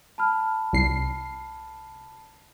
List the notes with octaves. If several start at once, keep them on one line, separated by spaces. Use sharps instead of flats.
A5 B5 F6
C2 C7